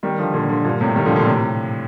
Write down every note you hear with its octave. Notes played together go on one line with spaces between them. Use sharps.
D#3 G3
D3 F3
A#2 D3
D3 F3
G2 A#2
A2 C3
D#3 G3
D3 F3
A#2 D3
A2 C3